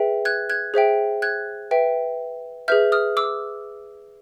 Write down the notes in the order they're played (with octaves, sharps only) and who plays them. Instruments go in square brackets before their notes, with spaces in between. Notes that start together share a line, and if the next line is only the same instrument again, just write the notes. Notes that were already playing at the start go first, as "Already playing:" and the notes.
Already playing: [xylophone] G#4 B4 E5 G5
F#6 G#6
F#6 G#6
G#4 C5 E5 G5
F#6 G#6
B4 E5 G5
G#4 B4 E5 F6 G6
D#6 F6
D6 E6